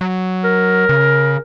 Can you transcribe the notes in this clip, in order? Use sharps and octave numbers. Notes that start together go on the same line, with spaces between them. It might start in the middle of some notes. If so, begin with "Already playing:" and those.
F#3
A#4
C#3